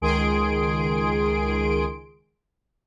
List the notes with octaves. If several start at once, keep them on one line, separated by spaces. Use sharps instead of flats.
C#2 D#3 G#4 C6 D7